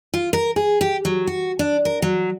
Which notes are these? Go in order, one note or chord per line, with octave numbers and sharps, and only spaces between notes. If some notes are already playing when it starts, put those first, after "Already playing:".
F4
A#4
G#4
G4
F#3
F#4
D4
A#4
F#3